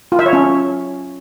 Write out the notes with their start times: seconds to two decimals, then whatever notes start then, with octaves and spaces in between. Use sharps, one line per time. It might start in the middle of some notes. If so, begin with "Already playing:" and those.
0.12 F4
0.19 E5
0.26 C#5
0.33 C#4